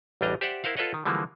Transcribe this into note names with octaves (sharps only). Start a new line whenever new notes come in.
A1 E2 G3 D4 D#5 A#5
G4 C5 D5 E5 F#5
E4 A#4 C5 F5 F#5
F4 A4 B4 C#5 D#5 F#5
D#3
D3 E3 F3 G3 G#3 A#3